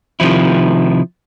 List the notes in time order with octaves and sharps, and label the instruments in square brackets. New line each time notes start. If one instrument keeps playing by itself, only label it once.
[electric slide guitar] C3 D#3 F3 E4